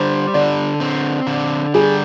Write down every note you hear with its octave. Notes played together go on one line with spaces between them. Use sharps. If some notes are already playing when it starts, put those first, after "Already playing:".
Already playing: D3 G3 C5
D3 D5
C4
D3
G3 G#4